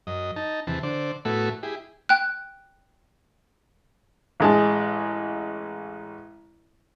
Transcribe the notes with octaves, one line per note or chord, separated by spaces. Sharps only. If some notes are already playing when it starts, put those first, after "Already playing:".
F#2 D#5
D#4 A5
E2 C3 E3 A5
D3 C5 D5
A2 A3 B3 E4 F#4 A4
E4 G4 G#4
G5 F#6
A1 G#3 A5